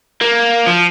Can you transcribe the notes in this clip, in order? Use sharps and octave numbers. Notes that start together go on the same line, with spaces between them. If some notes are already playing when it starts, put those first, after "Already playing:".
A#3
F3